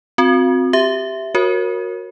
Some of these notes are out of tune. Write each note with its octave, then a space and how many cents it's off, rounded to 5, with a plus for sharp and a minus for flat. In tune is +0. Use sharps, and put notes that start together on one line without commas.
C4 +0 F#4 -40
G4 +0 E5 +0
F#4 -20 A#4 +0 C#5 -30